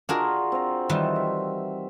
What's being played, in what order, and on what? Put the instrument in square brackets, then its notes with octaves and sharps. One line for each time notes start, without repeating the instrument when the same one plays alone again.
[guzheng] D4 G#4 A#4 [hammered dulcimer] F4 F#4
[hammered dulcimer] C4 A#5
[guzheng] D#3 E3 G3
[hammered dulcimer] E5